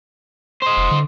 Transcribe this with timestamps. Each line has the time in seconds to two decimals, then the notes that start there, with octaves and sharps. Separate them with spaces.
0.62 C5 D#5
0.77 F1
0.91 D3